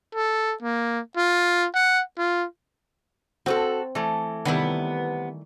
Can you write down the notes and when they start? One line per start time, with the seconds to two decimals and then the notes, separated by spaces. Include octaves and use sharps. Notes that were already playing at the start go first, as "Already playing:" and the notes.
0.15 A4
0.63 A#3
1.17 F4
1.75 F#5
2.18 F4
3.46 C4 F#4 G#4 A4
3.95 E3 A3
4.45 C3 D#3 G3 B3 E4